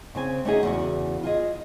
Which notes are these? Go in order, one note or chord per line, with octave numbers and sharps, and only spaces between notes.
C#3 C4 G#5
A3 A#3 C#4 D#4 F#4 G#4
E2 C#3 F#4
F4 G#4 D#5